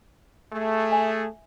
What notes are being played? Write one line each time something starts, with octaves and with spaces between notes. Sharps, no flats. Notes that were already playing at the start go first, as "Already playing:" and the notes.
A3 G#4
E5 G#5